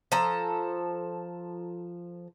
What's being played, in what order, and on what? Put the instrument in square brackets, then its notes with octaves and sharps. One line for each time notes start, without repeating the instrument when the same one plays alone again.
[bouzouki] F3 A4 A#5